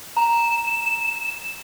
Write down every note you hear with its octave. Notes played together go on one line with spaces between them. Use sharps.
A#5 E7